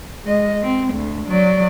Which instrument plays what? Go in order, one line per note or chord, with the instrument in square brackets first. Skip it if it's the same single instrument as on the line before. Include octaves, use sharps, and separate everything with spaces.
[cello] G#3 D#5
C4
D2
F#3 D5